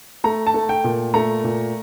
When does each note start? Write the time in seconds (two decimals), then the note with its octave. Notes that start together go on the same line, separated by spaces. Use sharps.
0.24 A3 A#5
0.47 A5
0.54 A3
0.69 G5
0.84 A#2
1.14 A3 A#5
1.44 A#2